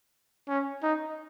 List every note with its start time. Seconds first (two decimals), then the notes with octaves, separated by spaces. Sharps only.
0.49 C#4
0.83 D#4